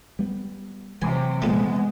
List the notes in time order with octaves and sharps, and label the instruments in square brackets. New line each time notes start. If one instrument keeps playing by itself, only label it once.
[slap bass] G3 B3
[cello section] C3 F#3 [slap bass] E3 [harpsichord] G#5
[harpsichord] A#1 A3 [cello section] G#3 [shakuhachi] B3